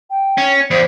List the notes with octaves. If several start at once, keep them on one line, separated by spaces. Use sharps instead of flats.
G5
C#4
E2 C5